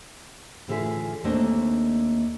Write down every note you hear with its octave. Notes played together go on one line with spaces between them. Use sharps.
A2 D3 E3 F4 G#4 E5
D#2 A3 A#3 C4 D4 D#5